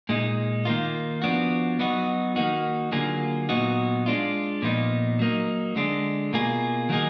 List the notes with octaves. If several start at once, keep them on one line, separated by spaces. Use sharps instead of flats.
A#2 G#3 D#4
D#3 A#3 F4
F3 B3 D4 F#4
F#3 B3 D#4 F#4
D#3 A#3 D#4 F#4
D3 F#3 A#3 F4 G#4
A#2 F#3 B3 D#4 F#4
G#3 D4 F4
A#2 F3 B3 D#4
F#3 A#3 D#4
D3 G#3 D4
B2 A#3 F4 G#4
D#3 F#3 A#3 D#4 G#4